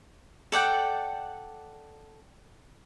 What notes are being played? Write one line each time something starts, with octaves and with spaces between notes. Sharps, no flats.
A4 D5 F#5 G5